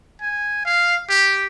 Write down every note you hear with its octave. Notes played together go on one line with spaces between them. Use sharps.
G#5
F5
G4